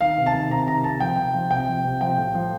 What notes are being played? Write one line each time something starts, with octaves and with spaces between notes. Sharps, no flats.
D#3 F5
C3
A5
D#3
C3 A#5
D#3 A#5
C3 A5
F3 G5
C3
F3
C3 G5
F3
C3
F3 G5
A2
F3